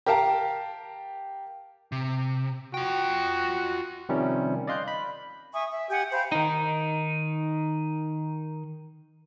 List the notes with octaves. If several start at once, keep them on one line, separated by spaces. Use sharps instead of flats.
G4 A#4 F5 A5 A#5
C3
F4 F#4 G5
C3 D#3 F3 G3 C#4
D5 D#5 F5 C6 F#6 G6
B5
E5 G#5 C#6 D#6
E5
G4 F#5 G#5
C5 F5 G5 B5
D#3 D#4